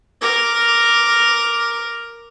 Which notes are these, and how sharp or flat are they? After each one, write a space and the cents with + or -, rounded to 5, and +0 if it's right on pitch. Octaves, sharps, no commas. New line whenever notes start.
A#4 +0 D6 +0